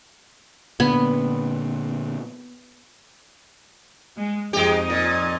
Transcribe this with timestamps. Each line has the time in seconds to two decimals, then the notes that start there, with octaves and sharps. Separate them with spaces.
0.80 A#2 D3 B3
4.17 G#3
4.53 F2 G#3 D#4 G4 D#5
4.90 A#2